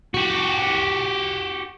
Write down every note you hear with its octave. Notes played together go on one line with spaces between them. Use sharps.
F#4 G4